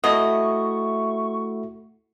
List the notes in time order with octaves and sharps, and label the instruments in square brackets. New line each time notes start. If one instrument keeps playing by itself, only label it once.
[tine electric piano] A3 E4 F#4 [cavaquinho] D#5 [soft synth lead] C#6